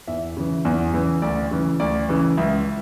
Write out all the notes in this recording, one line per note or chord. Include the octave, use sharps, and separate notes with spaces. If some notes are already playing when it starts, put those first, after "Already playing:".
E2 E5
C#3 E3
E2
C#3 E3
D2 D5
C#3 E3
D2 D5
C#3 E3
C#2 E5